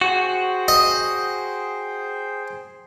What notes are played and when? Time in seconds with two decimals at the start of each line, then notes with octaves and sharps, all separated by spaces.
0.01 F#4 G#4 C5 G5
0.68 D#5